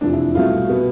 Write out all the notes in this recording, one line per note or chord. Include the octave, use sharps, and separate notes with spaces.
F1 E2 C3 F3 D4
E4
C2 B2 A3 F4
B2 B3